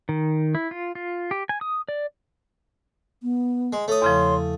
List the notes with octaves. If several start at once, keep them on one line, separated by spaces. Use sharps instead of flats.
D#3
E4
F4
F4
G4
G#5
D#6
D5
B3
G#3
A3 C#5 D#6
E2 C#3 F3 C6